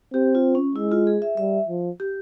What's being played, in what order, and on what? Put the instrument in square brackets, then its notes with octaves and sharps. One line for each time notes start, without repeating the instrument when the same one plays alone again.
[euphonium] C4 [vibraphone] G4
[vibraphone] F4
C#4
[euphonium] G#3 [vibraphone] E4
[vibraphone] F4
G#4
E5
[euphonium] G3 [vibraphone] E5
[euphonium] F3
[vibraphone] G4